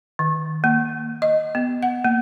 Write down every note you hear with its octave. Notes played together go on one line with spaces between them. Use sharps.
D#3
A#3
D#5
B3
F#5
A#3